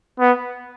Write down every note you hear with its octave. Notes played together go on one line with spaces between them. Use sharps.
B3